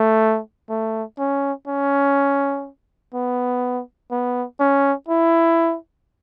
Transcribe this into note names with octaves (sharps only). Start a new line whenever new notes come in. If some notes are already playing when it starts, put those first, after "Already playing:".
Already playing: A3
A3
C#4
C#4
B3
B3
C#4
E4